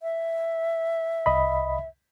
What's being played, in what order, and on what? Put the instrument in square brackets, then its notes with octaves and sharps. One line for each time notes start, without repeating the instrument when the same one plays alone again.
[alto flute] E5
[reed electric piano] C2 D#5 B5